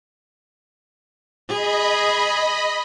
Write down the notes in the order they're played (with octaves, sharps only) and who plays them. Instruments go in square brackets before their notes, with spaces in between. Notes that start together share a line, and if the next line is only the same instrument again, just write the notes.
[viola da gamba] G#4 [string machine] D#5 B5